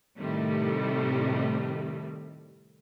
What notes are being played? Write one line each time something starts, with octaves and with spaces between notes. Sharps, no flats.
A2 C3 D#3 G3 A3